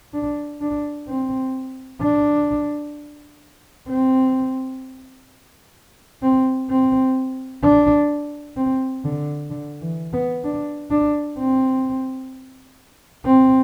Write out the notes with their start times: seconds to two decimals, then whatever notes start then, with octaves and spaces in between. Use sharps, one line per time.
0.13 D4
0.61 D4
1.07 C4
2.01 D4
3.88 C4
6.22 C4
6.70 C4
7.63 D4
8.57 C4
9.04 D3
9.50 D3
9.81 E3
10.13 B3
10.44 D4
10.91 D4
11.38 C4
13.25 C4